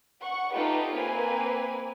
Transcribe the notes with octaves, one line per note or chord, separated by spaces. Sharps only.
F#5 C#6
A3 D#4 F4 G4 B4
A#3 C4 B4 G#5